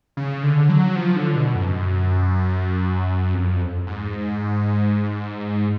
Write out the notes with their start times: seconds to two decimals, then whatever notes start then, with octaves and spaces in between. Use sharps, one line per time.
0.17 C#3
0.43 D3
0.69 F#3
0.96 F3
1.16 D3
1.36 B2
1.55 F#2
3.34 F2
3.87 G#2